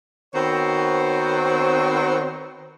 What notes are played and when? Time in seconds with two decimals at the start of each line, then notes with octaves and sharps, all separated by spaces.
0.34 D#3 B3 C4 F#4 C5 C#5